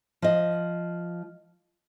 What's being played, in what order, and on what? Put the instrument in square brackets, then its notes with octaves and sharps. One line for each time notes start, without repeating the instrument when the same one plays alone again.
[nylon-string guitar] F3 D#5